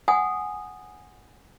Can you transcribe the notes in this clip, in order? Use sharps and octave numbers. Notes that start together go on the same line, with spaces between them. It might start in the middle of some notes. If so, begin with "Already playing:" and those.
F#5 G#5 D#6